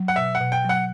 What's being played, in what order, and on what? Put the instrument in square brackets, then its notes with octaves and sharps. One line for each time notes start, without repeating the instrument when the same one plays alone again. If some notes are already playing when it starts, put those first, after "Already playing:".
Already playing: [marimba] F#3
[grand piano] F#5
[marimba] B2 [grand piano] E5
[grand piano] F#5
[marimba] B2
[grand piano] G5
[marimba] F#3
[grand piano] F#5